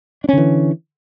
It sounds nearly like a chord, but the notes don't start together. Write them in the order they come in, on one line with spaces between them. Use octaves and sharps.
D4 C#4 D3 E3